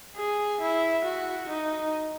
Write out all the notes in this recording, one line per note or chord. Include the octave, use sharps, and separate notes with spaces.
G#4
E4
F#4
D#4